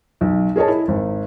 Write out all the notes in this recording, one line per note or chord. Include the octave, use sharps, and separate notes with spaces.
B1
G#4 A#4 C#5 D#5 A5
E4
G#1